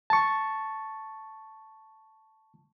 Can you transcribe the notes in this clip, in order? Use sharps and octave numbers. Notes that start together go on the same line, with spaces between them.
A5 C#6